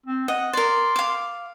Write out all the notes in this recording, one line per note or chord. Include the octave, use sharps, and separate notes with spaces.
C4
D#5 F#5
A#4 D5 C6
F5 D6